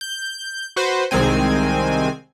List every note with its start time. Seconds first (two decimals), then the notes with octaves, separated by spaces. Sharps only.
0.01 G6
0.76 F#4 B4 C5
1.11 C2 D#3 G#3 C4 G#5